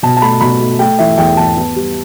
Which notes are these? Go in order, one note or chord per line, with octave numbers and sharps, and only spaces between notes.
B2 A5
A5
A3 B5
B2 B5
A3
A3 G5
E3 E5
E2 G5
E2 A5
B3
G3